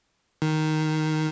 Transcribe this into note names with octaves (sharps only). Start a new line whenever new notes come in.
D#3